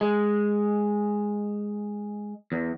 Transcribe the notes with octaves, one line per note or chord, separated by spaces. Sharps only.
G#3
E2